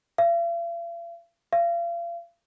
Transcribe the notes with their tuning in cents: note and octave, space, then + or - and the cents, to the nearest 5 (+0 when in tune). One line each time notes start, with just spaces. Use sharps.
F5 -45
F5 -35